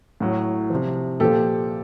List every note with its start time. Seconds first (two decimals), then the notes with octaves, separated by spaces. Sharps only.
0.20 A2 F#3
0.70 C3 F3
1.20 A#2 F3 G4 A4